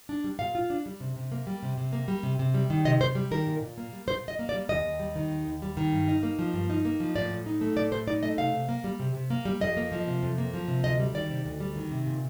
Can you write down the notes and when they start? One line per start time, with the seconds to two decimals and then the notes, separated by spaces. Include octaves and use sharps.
0.09 D4
0.24 G3
0.39 A#2 F5
0.55 F4
0.70 D4
0.86 G3
1.01 C3
1.16 C3
1.32 A#3
1.47 G3
1.63 C3
1.77 C3
1.93 A#3
2.08 G3
2.23 C3
2.39 C3
2.54 G3
2.70 D#3
2.85 C3 D#5
3.01 C3 C5
3.15 G3
3.31 D#3 A#4
3.47 A#2
3.63 A#2
3.78 A#3
3.93 G3
4.08 A#2 C5
4.23 A#2 D#5
4.39 A#3
4.49 D5
4.54 G3
4.69 D#2 D#5
4.85 D#2
5.00 G3
5.16 D#3
5.30 D#2
5.47 D#2
5.62 G3
5.77 D#3
5.92 G2
6.08 D#4
6.23 A#3
6.39 F3
6.54 G2
6.70 D#4
6.85 A#3
7.00 F3
7.16 A2 D5
7.30 A2
7.46 D#4
7.61 A3
7.76 A2 D5
7.92 A2 C5
8.07 D#4 D5
8.23 A3 D#5
8.38 C3 F5
8.53 C3
8.69 A#3
8.84 G3
9.00 C3
9.15 C3
9.30 A#3
9.45 G3
9.61 F2 D#5
9.77 A#3
9.92 F3
10.07 C3
10.23 F2
10.38 A#3
10.54 F3
10.68 C3
10.84 D2 D#5
10.99 G3
11.14 D#3 D5
11.30 C3
11.45 D2
11.61 G3
11.76 D#3
11.91 C3
12.06 A#2